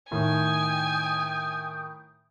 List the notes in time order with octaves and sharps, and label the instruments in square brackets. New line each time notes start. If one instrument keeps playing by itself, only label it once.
[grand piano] A2 D#3 [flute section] G5 D#6 G6 [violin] G#5